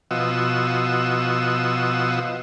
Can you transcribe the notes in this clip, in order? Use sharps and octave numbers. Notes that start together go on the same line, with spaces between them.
B2 F3 F#4 D#5 E6